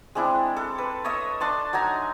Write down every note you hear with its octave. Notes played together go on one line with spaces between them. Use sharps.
G#3 C4 D4 E4
A4
B4
C#5 D#5 E5 D#6
D4 A5 C6
F#3 D#4 G#5 A#5